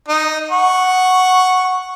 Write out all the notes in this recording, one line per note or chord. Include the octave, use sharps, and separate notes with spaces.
D#4 D#5
F#5 C#6